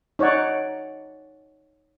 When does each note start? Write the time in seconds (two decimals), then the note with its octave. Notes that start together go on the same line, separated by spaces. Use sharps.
0.19 D#4 C#5 D5 F#5